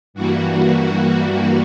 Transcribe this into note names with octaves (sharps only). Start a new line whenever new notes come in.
G2 E3 G3 A#3 F#4
F#4
F#4
F#4